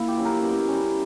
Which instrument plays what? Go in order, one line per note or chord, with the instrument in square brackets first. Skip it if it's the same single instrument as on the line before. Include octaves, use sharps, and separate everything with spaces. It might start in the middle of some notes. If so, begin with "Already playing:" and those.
Already playing: [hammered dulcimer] A#2 A#3 E4
G4
F#3 C#4
A#4
B2
G3 C#4